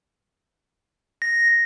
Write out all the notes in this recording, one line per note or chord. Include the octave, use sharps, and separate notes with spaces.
A#6